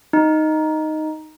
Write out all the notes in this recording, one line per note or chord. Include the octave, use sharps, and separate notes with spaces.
D#4